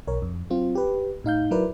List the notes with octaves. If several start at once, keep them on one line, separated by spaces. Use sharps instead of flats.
B1 A#4 C#5
F2
F#3 C4 F4
G4 B4
A2 D#4 F5 G6
F#3 E4 A#4 B4 D5